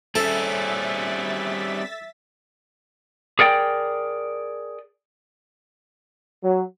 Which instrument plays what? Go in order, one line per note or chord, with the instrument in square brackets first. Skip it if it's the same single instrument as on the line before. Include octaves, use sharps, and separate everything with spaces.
[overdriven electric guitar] G3 C#4 [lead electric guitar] C4 G#4 [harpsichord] A4 [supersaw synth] E5 A6 B6
[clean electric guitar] G#4 A#4 D5 G5
[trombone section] F#3